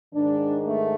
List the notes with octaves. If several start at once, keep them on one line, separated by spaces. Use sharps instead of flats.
G#2 D#3 D4
A3